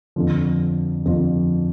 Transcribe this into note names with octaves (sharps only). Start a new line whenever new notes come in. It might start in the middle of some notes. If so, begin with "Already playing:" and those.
F2 D3 F3
F2 D3 F3